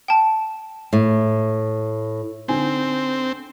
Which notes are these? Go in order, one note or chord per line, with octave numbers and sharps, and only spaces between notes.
G5 A5
A2
D3 C4 D#4 G#5